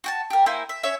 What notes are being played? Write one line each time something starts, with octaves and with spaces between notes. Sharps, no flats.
F#4 G5 A5
G4 A#4
A#3 E4 C5 G#5
E5
C#4 C#5 E5